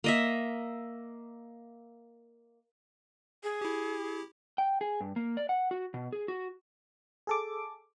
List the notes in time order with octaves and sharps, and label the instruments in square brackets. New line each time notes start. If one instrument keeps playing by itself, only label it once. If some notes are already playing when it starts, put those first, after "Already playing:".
[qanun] A#3 D#5 E5
[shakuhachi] G#4
[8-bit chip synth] E4 G4
[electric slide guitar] G5
G#4
G2
A#3
D5
F#5
F#4
B2
G#4
F#4
[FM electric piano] G#4 A4 D6